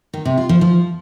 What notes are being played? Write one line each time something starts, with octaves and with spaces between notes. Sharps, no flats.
D#3
C3
F4
F3
F3